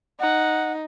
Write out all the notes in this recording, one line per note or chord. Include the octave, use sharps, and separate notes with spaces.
D#4 F#5